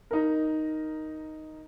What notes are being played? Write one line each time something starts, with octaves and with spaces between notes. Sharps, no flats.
D#4 A#4